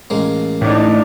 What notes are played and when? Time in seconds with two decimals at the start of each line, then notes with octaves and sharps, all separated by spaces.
0.10 A1 G#3 A#3
0.61 A2 D4 D#4